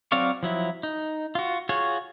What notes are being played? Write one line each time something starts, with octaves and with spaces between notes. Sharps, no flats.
F#3 C4 D5 F5 C#6
F3 F#3 E4
D#4
F4 F#4
F4 F#4 G#4 C#5